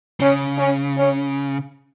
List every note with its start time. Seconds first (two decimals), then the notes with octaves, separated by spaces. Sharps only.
0.20 C#3 C#4
0.58 C#4
0.97 C#4